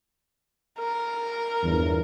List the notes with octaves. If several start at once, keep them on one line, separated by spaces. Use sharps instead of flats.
A#4
G1 E2